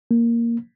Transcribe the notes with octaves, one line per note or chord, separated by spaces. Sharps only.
A#3